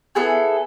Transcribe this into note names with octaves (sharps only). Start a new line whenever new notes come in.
B3 E4 G#4 A4